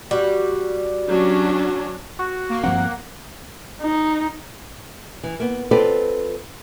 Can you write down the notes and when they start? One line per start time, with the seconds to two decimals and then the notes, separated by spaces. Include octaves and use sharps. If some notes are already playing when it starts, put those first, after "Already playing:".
0.11 G3 F#4
1.07 F#3 C#4 D4
2.19 F#4
2.49 A#3
2.64 G2 F3 C4 F#5
3.82 D#4
5.23 E3
5.40 A#3 B3
5.71 C4 F4 A4 B4 C5 D5